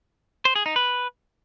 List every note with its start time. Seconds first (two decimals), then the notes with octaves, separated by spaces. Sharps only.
0.45 C5
0.56 G#4
0.66 D#4
0.76 B4